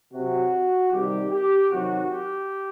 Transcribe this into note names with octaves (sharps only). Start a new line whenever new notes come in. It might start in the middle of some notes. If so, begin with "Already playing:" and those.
C3 F#3 F#4
C3 D#3 G3 G4
G4
C3 D#3 F#3 F#4
G4